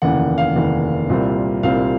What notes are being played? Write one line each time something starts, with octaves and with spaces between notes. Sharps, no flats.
F1 D#2 C#3 E3 F#5
F5
F1 D#2 C#3 E3
C2 A#2 G3 C4
C2 A#2 G3 C4 F5